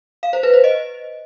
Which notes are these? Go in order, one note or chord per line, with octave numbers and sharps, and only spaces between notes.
F5
C5
B4
C5
D#5